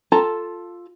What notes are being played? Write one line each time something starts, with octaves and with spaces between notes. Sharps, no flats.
F4 A4 A5 A#5